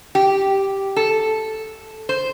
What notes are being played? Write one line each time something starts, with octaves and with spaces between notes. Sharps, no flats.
G4
A4
C5